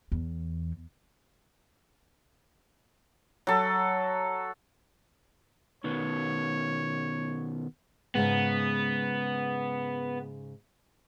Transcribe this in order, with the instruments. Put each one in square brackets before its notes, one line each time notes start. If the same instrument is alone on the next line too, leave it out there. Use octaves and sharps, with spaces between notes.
[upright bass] E2
[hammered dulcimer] F#3 A4
[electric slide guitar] B2 D#3 B3 [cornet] C#5
[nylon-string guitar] G#2 C#3 G#3 [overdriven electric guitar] B3